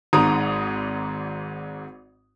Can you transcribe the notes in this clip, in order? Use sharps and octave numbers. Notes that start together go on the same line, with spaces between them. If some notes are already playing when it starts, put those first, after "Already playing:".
G#1 G#2 A#5 D#6